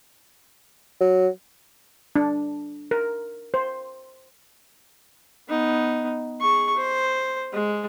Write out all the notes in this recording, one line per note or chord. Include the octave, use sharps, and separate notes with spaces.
F#3
D4
A#4
C5
B3 D#4
G#4 C#6
C5
G#3